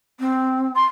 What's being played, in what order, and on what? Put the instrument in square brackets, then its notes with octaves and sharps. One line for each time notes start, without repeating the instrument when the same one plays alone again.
[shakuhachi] C4
[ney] C6